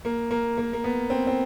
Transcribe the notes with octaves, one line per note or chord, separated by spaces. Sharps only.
A#3
A#3
A#3
A#3
B3
C4
C4